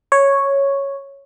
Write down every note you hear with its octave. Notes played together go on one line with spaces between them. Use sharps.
C#5